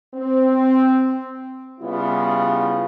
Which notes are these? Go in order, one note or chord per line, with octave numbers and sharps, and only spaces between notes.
C4
C#3 G3 B3 E4 F4